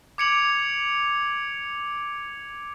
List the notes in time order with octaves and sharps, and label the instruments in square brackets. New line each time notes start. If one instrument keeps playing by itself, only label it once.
[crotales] D6 G#6 C#7 D7 F7 F#7